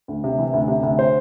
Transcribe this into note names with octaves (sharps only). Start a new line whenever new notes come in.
D2
C3
E3
D2
C3
D2
C5